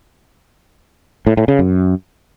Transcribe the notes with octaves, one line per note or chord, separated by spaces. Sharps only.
A2
A2
C#3
F#2